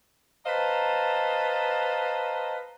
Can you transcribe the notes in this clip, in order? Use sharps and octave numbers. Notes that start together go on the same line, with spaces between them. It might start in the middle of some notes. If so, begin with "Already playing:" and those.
B4 C5 D#5 F5 A5 A#5